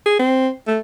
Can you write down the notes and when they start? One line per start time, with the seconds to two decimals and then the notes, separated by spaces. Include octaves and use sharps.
0.06 G#4
0.19 C4
0.67 A3